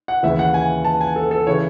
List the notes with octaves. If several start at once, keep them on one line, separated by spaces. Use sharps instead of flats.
F#5
D#2 C#3 E3 E5
F#5
G#5
A5
G#5
A4
A4
C#3 E3 C#5